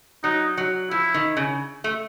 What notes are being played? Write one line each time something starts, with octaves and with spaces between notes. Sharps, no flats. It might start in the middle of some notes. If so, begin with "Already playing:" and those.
F#3 D#4
F#3
F3 E4
D#3
C#3
A3